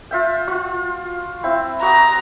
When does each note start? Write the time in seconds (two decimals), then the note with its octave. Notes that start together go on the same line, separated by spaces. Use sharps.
0.11 F4 E5 G5
0.48 F4 F#4
1.44 C4 E4
1.82 F#4 A#5 D#6